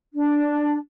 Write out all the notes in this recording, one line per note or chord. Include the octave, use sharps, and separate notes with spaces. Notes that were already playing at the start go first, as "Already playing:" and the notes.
D4